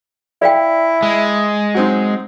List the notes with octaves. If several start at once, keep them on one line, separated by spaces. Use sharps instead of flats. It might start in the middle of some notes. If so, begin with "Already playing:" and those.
E4 D5 F5 G5
G#3
F#3 C4 D#4